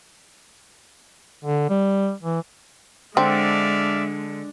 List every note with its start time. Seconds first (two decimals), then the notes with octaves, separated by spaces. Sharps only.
1.44 D3
1.70 G3
2.23 E3
3.17 D3 G#3 C4 D5 E5 F5